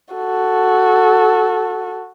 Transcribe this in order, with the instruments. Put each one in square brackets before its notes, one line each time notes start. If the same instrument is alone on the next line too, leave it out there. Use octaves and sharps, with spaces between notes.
[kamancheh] F#4 A4